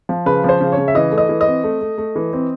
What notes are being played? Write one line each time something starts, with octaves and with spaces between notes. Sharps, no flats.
F3
C#3 B4
F3 C5
C#3
C#5
C#3
E5
E3 D#5
A3
D#5
E3
D#5
C4
A3
A3
A3
E3
C4